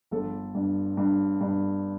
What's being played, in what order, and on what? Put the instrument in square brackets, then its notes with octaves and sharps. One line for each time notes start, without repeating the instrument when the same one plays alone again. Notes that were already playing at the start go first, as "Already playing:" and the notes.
[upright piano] G1 A4
G2
G2
G2